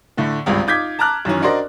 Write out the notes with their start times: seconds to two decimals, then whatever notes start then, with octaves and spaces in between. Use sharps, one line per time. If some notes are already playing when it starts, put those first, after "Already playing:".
0.17 A2 D3 A3
0.46 G#1 C#2 G2
0.67 D#4 F4 D6 G6 G#6 B6
0.99 A5 A#5 D6 F6 F#6
1.25 F#2 D#3 E3 C#4
1.42 D4 F#4 A#4 C5 D5 D#5